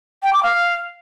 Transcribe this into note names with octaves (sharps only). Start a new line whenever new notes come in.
G5
D6
F5